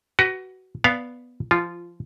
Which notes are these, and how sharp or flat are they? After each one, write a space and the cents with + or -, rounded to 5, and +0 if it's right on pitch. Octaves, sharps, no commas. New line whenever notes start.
F#4 +20 B4 +0
B3 +0 D5 +0 F5 +0
F3 -20 F4 +0